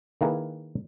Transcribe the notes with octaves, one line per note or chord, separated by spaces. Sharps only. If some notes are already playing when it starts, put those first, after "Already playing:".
D#3 A#3 E4 G#4 A#4 B4